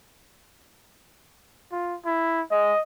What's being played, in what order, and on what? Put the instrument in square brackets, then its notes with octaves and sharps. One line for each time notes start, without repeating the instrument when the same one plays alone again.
[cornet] F4
E4
[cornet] G#3 [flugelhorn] D#5